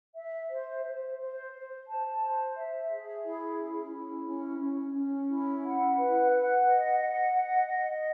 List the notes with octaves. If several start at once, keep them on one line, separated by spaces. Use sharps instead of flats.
E5
C5
C5
C5
C5
A5
C5
E5
G#4
E4
C#4
E4
C#4
C#4
C#4
E4
F#5
B4
F#5
D#5
F#5
D#5
D#5